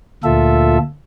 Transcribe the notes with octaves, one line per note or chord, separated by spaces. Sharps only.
D2 A#2 F4 A4 E5